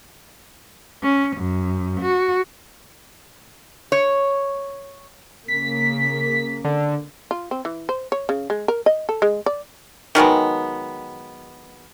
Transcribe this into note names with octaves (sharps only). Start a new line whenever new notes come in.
C#4
F#2
F#4
C#5
C#3 A#3 B6
D3
F4
C4
E3
C5
C#5
C#3
G#3
A#4
D#5
A4
G#3
D5
D#3 F#3 G#3 B3